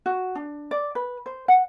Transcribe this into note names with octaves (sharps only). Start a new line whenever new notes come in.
F#4
D4
D5
B4
C5
F#5